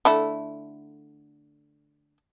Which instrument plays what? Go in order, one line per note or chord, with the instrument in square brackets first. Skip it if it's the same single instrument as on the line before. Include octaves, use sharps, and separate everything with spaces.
[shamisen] D3 A3 E4